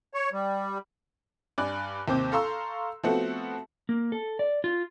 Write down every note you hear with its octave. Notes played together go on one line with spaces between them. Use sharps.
C#5
G3
G2 D5 G#5 F#6
D#2 C3 C4 C5 D6 G6
A4 F5 A#5 C6 C#6 E6
F3 A3 B3 C4 F#4 A4
A#3
A4
D5
F4